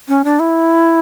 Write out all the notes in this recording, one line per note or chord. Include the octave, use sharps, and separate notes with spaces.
C#4
D4
E4